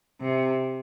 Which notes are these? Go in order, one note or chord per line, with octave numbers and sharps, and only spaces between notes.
C3